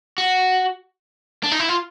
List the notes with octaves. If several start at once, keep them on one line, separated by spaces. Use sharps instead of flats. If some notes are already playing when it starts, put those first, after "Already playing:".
F#4
D4
D#4
E4
F4